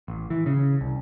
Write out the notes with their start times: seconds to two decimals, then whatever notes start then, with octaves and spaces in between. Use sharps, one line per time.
0.08 A1
0.30 E3
0.46 C#3
0.81 C2